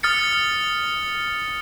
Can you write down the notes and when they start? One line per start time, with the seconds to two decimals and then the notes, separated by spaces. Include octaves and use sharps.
0.03 D#6 F6 A6 C#7